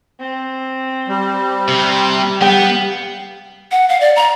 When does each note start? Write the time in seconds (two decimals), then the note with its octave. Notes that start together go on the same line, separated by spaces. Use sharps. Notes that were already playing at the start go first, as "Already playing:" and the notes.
0.20 C4
1.08 G3
1.68 C3
2.41 G3 B3 F5 G5
3.71 F#5
3.89 F5
4.00 D5
4.16 A#5